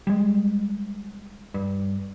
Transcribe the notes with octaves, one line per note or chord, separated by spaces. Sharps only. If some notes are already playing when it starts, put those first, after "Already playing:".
G3 G#3
G2